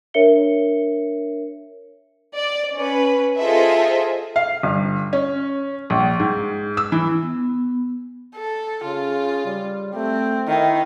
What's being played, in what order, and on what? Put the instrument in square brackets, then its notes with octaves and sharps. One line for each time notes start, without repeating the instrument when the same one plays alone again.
[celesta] D4 A#4 C#5 E5 C#7 G7
[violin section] D5
C#4 B4
F4 G#4 A4 C5 D#5 E5
[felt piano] F5
G1
C#4
A#1
G#2
E6
E3
[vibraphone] B3
[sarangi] A4
[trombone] C#3 [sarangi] F4
[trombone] G3
[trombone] A3 [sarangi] C4
[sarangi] D#3 [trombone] E4